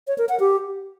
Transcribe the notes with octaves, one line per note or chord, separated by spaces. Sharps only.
C#5
A#4
F#5
G4